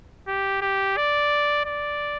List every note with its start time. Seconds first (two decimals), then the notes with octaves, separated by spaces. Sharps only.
0.27 G4
0.62 G4
0.97 D5
1.65 D5